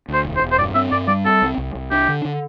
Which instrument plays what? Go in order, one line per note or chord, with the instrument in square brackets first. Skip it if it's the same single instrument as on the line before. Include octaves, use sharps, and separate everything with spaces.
[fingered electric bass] D2 [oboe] C5
[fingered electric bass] E1
[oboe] C5
[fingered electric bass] E1
[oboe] C5
[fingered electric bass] G2 [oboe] D5
[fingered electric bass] C4 [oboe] E5
[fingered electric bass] G2 [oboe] D5
[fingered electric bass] G3 [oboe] D5
[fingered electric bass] C4 [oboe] A4
[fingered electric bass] C2
C2
C2
[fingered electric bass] D4 [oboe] G4
[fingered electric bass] D3
D3